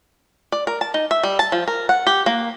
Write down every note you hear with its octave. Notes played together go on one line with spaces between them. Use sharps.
D5
A#4
A5
D#4
E5
G3
A5
F3
A#4
F#5
G4
A#3